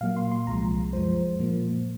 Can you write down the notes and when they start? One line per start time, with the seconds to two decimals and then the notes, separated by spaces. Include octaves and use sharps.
0.01 A#2 F#3 A#3 F5
0.16 C6
0.32 C6
0.47 C2 C3 F3 G#3 A#5
0.93 F#2 F3 G#3 C5
1.39 A#2 F3 A#3